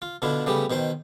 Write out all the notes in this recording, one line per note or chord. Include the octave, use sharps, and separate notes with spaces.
F4
B2 D3 D4 E4 F4
C#3 G3 A3 B3 G4
B2 D#3 C5 G5